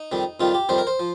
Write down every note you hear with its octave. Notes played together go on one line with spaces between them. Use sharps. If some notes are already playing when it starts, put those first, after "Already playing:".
Already playing: D#4
F2 D#3 G3
F2 D#3 G3 F4
G4
F2 D#3 G3 C5
A#4
C5
F3